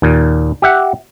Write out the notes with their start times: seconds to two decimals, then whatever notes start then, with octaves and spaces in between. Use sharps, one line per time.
0.02 D#2 A#2
0.62 G4 E5 F#5